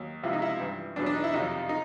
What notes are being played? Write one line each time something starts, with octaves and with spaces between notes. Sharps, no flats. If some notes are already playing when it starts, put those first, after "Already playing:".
Already playing: D#2 F#3
C#2 C3 F3 E4
D#4
E4
G2 E3
E2 B2 F#3 D4
D4
D#4
E4
F2 C3 D#3 F#3 D#4
D#4